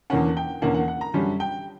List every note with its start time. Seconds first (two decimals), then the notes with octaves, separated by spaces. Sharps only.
0.10 E2 D3 A#3 C#4 F#5
0.37 G5
0.62 E2 D3 A#3 C#4 F#5
0.74 F#5
0.88 F#5
1.01 A#5
1.14 F#2 D3 G3 C#4
1.40 G5